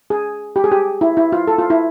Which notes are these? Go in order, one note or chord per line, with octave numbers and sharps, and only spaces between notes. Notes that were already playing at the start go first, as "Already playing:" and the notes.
G#4
G4
G#4
G4
E4
E4
F4
A4
F4
E4